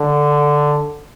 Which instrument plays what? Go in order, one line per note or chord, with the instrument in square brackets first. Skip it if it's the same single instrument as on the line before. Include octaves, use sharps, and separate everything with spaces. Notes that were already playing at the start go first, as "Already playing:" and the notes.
Already playing: [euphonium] D3